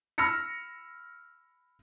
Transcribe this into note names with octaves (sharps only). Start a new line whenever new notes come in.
B5 E6 F6 A#6 C#7